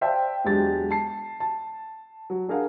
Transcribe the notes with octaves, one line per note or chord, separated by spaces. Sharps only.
C5 D5 E5 F5 G5 A5
E1 F#3 G#3 D4 G4 A6
A5 C7
A5
F#3
D4 G#4 A#4 F5 F#5